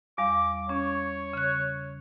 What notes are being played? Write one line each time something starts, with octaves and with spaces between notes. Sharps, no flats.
E2 G3 F5 D6
C#4 C#5
C#3 F#6